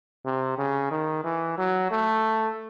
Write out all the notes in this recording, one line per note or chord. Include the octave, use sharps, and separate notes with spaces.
C3
C#3
D#3
E3
F#3
A3